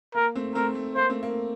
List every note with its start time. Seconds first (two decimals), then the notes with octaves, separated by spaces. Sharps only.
0.15 A#3 A#4
0.35 A3 C4
0.55 A3 C4 A#4
0.75 A3
0.96 A#3 C5
1.09 A3 C4
1.23 A#3